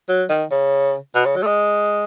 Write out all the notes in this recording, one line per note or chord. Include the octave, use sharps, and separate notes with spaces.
F#3
D#3
C#3
B2
C#3
F#3
A3
G#3